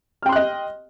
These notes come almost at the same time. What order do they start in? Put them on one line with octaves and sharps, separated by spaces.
F6 G5 C6 F#6 D#5